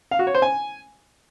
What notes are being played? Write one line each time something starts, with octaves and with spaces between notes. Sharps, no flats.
F5
F#4
C#5
C5
G#5